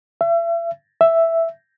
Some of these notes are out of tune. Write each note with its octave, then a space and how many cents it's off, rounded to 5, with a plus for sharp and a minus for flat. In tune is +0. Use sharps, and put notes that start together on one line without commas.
E5 +40
E5 +5